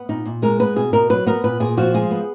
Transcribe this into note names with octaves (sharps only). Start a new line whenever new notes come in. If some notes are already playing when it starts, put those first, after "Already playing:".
Already playing: B3
A#2 D#4
A#2
G#3 A#4
B3 B4
B2 G#4
B2 A#4
F#3 B4
B3 A#4
A#2 B4
A#2 G#4
F3 F#4
G#3 G#4
B3